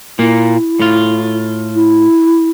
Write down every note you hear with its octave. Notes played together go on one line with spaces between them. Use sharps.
A#2 A#3 E4
A2 F4
E4